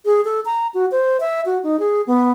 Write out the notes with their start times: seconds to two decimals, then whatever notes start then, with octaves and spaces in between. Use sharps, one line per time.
0.05 G#4
0.25 A4
0.45 A#5
0.74 F#4
0.92 C5
1.20 E5
1.46 F#4
1.64 D#4
1.79 G#4
2.07 B3